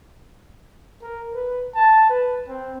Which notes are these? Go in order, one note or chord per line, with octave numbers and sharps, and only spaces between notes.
A#4
B4
A5
B4
C4